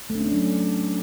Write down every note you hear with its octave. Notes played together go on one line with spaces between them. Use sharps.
A3
D4
C#4
D4
F#3